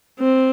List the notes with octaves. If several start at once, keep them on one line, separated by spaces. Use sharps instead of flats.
C4